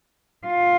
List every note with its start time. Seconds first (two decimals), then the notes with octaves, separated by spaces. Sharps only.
0.47 F4